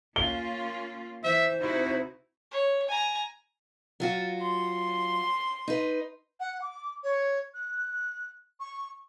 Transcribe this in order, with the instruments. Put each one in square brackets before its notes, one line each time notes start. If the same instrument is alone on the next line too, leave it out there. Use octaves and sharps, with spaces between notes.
[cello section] A#3 C#4 F4 [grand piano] G7
[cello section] E3 [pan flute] C5 [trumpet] E5
[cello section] C3 D#4 F#4 [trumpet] E4
[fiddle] C#5
G#5 A#5
[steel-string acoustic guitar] F#3 F4 F#4
[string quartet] C6
[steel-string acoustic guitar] D#4 B4
[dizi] F#5
D6
C#5
F#6
C#6